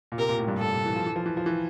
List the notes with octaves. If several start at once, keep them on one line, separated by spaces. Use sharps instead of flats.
A#2
C3 A#4
A#2
A2
G2
A2 A4
C3
E3
F3
E3
F3
E3
F3
E3